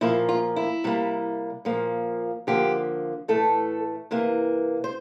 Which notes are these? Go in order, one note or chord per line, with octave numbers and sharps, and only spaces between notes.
A#2 F3 A#3 E4
F4
E4
C3 G3 A#3
A#2 F3 A#3
D3 F3 A#3 G4
A2 E3 A3 A4
C3 E3 A#3
C5